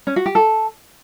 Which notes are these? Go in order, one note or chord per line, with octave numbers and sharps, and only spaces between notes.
C#4
F#4
G4
A4